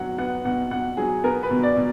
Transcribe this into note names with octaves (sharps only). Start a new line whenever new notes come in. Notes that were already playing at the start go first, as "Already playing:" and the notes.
Already playing: B2 F#3 F#5
B3 F#5
B2 F#5
B2 F#5
F#3 G#4
B3 A#4
B4
B2
D5
B2